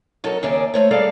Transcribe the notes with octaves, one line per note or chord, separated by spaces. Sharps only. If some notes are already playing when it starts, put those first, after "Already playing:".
F#3 D#4 A4 A#4
D#2 C#3 G#4 A#4 D5 E5
A3 C5 C#5
G3 A#3 G#4 A4 D5 F5